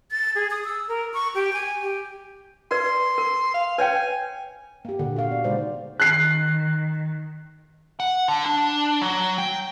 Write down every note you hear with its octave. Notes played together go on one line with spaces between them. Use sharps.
A6
G#4
D#6
E6
A#4
C#6
G4
G#5
G4
A#4 B4 D5 C6
A#4
F5
B4 C#5 G5 G#5
A#3 G4
A#2 D3 F#5
F#4 F5
B3 D5
C#3 G#3 D#4 C5 D5
D#3 F#6 C7
F#5
D3
D4
F#3
G5